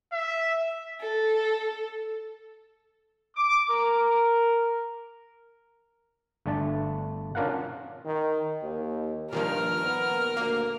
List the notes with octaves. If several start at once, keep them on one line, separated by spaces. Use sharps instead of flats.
E5
A4
D6
A#4
G1 A3 D4 A5
C#4 D4 F4 A#4 F5 F#5
D#3
D#2
G2 A#2 D#3 F3 A#4 F6
B3
D2 A#3